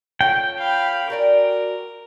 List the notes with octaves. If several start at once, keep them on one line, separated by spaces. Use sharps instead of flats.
C#4 F4 A4 G5
F5 B5
F#4 A#4 D5 G#5